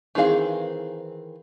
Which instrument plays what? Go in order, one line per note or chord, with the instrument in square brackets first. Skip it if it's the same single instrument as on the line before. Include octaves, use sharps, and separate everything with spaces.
[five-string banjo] D#3 E3 C4 G#4 F5